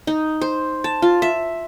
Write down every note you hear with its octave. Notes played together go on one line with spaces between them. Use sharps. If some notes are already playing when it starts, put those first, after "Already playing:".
D#4
C5
A5
F4
E5